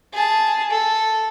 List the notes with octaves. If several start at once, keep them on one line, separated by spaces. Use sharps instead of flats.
G#4 A5
A4